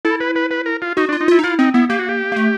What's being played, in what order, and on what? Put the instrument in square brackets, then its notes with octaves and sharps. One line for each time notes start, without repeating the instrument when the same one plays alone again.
[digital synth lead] E4 [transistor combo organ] A4
[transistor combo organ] B4
B4
B4
A#4
F4
[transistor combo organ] D#4 [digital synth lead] F#4
[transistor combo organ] D4
[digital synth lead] F4
[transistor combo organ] D#4
[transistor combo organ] E4 [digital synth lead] F4
[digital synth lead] D#4
[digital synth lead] E4 [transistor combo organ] F4
[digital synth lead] C4 [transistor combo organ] D#4
[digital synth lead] B3 [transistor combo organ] E4
[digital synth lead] A#3 [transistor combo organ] G4
[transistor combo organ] F#4
G4
[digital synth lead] A#3
A3